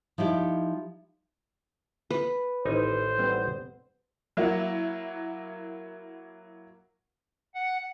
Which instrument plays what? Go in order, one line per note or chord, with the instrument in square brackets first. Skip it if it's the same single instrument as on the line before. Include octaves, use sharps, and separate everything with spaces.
[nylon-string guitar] F3 D#4 E4 G4
[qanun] B4
[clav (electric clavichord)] A1 D#4 G#5 [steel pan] D#3 [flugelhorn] C5
[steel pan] G3 B3 C4
[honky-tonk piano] F#3 A#3 E4 F#4
[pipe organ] F#5